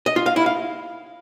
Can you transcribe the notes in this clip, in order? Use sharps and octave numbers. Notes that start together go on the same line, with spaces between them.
D#5
F4
F5
E4
F5